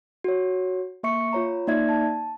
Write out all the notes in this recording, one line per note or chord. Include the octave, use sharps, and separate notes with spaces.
F#4 C#5
A#3 E5 C#6 C#7
F4 C#5 A#5
A#3 D#4 D5 E5 G#6
A5